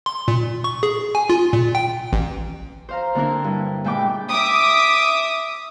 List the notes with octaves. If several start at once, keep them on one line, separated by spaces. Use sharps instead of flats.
C6
A#2
C#6
G#4
G#5
F4
A#2
G5
A1
C5 F5 A#5
D3 A#3 C4 D4 E4 A#4
G2
A#2 G#3 E5 G5 B5 D6
E5 D6 D#6